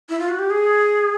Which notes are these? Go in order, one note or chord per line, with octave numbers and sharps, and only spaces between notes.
E4
F4
F#4
G4
G#4